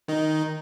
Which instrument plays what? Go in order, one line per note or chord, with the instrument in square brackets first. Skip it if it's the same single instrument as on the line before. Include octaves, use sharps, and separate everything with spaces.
[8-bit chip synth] D#3 D#4